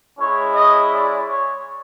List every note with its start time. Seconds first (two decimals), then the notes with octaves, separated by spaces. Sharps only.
0.19 G#3 C#4 E4 C#5
0.55 D#5
0.92 D5
1.29 C#5